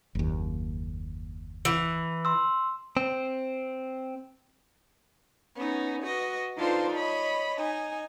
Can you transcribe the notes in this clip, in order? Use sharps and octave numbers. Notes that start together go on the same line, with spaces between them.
F#1 D#2
E3
C6 E6
C4
B3 C#4 D#4
F#4 B4 D#5
D4 D#4 F4 A4 B4 C5
C#5 D#5 B5
D#4 G#5